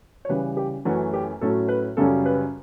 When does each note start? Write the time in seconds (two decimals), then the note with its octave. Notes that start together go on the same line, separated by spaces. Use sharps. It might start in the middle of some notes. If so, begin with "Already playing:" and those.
0.25 C#5
0.29 C#3 E3 G3 B4
0.57 G4
0.85 F#2 E3 A3 C#4 F#4
1.13 G4
1.41 A2 F#3 A3 C#4 A4
1.68 B4
1.97 F#2 C#3 G3 C#4 A4
2.26 B4